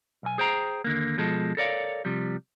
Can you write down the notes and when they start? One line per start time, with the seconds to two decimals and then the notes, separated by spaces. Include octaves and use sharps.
0.23 B1 G#5
0.38 G#4 C5 G5 A#5
0.84 D#2 D3 A#3
1.18 B2 F3 G#3 A4
1.57 A4 A#4 C#5 D5 E5 F5
2.05 C3 F3 G3